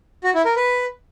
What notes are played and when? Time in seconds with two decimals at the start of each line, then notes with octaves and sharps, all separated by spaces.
0.24 F#4
0.35 E4
0.45 A#4
0.56 B4